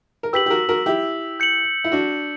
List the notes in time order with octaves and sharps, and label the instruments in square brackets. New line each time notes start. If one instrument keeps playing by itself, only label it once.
[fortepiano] A#4
[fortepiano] G4 B4 [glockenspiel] E6 B6 F#7
[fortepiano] G4
F#4 A#4
F#4 A#4
E4 G4
[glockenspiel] G6 C#7 F#7
[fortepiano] E4
D4 F#4